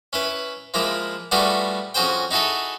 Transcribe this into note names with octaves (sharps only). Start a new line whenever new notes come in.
C#4 E4 B4
F3 G#3 A#3 E4 F4
G3 A3 B3 F4 F#4 G#4
F2 C#4 F#4 G#4 C5 G5
D#4 E4 F#4 G#4 A4